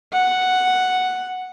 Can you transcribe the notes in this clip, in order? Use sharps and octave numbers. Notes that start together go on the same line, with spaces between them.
F#5